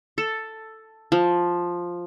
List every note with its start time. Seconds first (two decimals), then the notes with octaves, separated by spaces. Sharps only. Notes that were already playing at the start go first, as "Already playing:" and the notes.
0.18 A4
1.12 F3